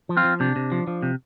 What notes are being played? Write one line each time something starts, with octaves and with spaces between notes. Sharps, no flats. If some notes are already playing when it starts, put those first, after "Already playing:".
F3
C4 F4
F3
C3 D4
C3
F3
F3
C3